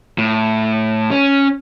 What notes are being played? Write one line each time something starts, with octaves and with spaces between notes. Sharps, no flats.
A2
C#4